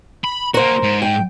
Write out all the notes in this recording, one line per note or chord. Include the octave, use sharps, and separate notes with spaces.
B5
A#3 F#4 A#4 C5
G#2
G5